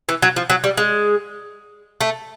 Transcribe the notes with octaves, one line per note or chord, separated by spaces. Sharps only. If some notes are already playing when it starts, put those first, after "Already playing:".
E3
F#3
F3
F#3
G3
G#3
A3